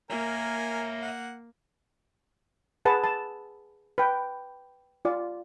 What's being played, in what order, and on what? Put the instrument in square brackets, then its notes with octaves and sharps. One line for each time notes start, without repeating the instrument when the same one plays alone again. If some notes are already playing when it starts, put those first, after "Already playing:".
[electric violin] A#3 [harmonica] A#4 G#5 [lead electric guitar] C#5 E5
[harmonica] F#5
[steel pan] G#4 B4 F#5 A5
A5
B4 G5
F4 D5